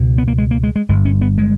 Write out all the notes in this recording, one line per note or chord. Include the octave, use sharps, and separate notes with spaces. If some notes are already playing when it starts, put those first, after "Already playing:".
Already playing: C#2 B2
B3
A#3
G#3
A#3
G#3
G#3
G1 G2 G#3
C#4
B3
G#3